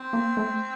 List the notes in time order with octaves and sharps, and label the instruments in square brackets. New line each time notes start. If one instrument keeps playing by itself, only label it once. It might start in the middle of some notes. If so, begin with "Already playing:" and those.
Already playing: [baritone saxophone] C4
[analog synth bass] A#3
A3